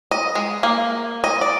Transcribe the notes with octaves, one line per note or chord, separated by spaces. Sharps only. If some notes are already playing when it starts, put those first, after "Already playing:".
D#5
G#3
A#3
D#5
D5